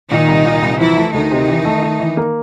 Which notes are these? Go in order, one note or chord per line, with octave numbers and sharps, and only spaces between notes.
A#2 D#3 D#4
C2
A#2
C2
E3 F3 E4
A3
D2 D#3 D#4
C3
E3
A3
A3
E3
A#3